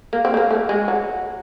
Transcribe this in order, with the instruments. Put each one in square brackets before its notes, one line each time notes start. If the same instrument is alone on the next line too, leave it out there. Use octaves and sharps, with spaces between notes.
[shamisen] A#3
C4
A3
A#3
A3
G#3
F#3